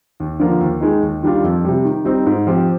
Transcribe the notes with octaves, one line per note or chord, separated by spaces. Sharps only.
D#2
D3 F3 A#3 F4
D#2
D#3 G#3 D#4
D#2
D#3 G3 D4 F4
F2
C3 G3
D#3
G3 C4 D#4
G#2
F3 C4 G4